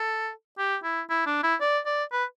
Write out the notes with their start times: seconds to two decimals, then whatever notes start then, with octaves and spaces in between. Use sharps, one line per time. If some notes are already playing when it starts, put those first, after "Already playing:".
Already playing: A4
0.58 G4
0.84 E4
1.10 E4
1.27 D4
1.43 E4
1.61 D5
1.86 D5
2.12 B4